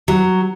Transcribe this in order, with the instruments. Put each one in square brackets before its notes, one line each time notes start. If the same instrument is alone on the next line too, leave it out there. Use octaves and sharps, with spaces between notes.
[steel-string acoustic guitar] F#3